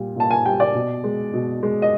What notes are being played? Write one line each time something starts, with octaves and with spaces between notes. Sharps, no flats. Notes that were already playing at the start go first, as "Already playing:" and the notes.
Already playing: A#2 G3
A#2 A5
G#5
G3 G5
D5
B2
G#3
B2
G#3
D#5